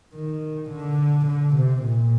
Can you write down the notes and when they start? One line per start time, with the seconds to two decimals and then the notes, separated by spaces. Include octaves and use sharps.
0.14 D#3
0.70 D3
1.26 D3
1.56 C3
1.83 A#2